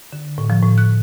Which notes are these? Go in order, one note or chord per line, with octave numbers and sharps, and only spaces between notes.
D3
A2
F3
A2
F#6